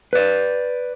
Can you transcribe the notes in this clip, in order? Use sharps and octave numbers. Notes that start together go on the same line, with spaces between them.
B4 D5